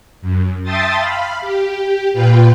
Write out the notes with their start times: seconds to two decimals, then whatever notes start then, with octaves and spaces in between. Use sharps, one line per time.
0.21 F#2
0.63 E5 G5 A5 C6 D#6 A6
0.98 F5 B5
1.41 G4
2.12 A#2 F4 B4 G5